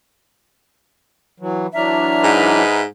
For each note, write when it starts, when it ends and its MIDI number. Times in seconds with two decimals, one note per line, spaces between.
1.40 1.67 52
1.40 1.67 54
1.74 2.63 52
1.74 2.63 54
1.74 2.63 62
1.74 2.81 76
1.74 2.81 82
1.74 2.81 89
2.22 2.82 44
2.22 2.82 63
2.22 2.82 71